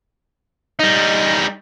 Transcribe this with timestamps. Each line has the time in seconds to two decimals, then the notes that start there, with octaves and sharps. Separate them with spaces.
0.79 G3 D#4